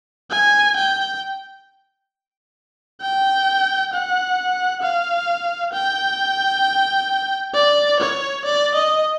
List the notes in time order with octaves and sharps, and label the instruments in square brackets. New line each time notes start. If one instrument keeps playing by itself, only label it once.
[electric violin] G#5
G5
G5
F#5
F5
G5
D5
C#5
D5
D#5